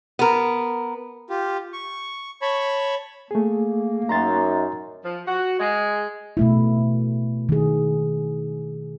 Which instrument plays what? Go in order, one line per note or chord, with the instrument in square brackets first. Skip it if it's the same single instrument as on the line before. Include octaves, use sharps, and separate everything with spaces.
[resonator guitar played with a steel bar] B3 A#4
[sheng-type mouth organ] F4 G4
C#6
C#5 A5 B5 C#6
[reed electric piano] A3 G#4 [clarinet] A#3
[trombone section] F#2 D#4 [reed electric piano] A#5 C6 A6
[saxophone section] F3
F#4
G#3
[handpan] B2 A3 E4
D#3 G#4